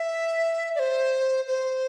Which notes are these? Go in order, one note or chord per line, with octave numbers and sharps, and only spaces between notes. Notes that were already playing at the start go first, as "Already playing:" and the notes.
Already playing: E5
D5
C5
C5